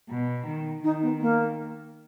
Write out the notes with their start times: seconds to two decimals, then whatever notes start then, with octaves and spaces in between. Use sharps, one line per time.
0.09 B2
0.46 D#3
0.84 D#3 D#4
1.02 B3
1.21 A#3